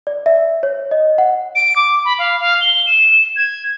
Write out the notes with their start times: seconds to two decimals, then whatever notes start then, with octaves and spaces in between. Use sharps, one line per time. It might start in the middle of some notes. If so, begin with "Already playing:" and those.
0.07 D5
0.26 E5
0.63 C#5
0.91 D#5
1.18 F#5
1.55 D7
1.76 D6
2.05 B5
2.19 F5
2.40 F5
2.61 G7
2.87 E7
3.36 G#6